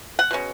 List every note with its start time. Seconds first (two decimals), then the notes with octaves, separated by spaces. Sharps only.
0.19 F#5
0.31 B2 G#3 C#4